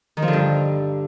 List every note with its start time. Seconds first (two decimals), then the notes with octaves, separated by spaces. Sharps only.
0.17 D#3
0.22 F3
0.28 D3
0.33 G2